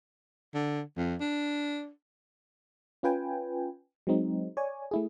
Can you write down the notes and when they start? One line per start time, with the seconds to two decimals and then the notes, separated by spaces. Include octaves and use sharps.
0.54 D3
0.97 F2
1.20 D4
3.03 C#4 F4 B4 G5 G#5
4.07 F#3 G#3 C4 D#4
4.57 C#5 D5 G#5
4.91 A3 E4 G#4